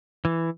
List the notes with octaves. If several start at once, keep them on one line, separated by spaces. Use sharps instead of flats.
E3